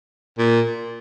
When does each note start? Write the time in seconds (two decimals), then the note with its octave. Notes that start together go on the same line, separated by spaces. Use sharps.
0.38 A#2